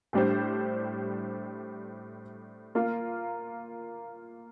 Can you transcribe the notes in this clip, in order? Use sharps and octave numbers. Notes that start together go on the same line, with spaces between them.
A2 G3 D4 G4 C5
A#3 F4 A#4 F5